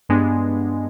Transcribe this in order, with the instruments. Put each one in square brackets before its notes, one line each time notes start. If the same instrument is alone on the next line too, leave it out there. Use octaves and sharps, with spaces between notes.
[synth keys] G2 G#3 B3 D4